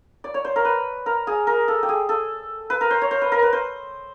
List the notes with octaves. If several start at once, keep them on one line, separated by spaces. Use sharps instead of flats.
D5
C#5
C5
A#4
B4
A#4
G#4
A#4
A4
G4
G#4
A4
B4
A#4
C5
C#5
C5
B4
A#4
B4
C5